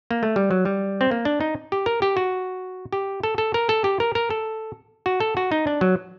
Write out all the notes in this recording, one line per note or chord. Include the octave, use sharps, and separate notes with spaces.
A#3
A3
G3
F#3
G3
C4
A#3
D4
D#4
G4
A#4
G4
F#4
G4
A4
A4
A#4
A4
G4
A#4
A#4
A4
F#4
A4
F#4
D#4
D4
F#3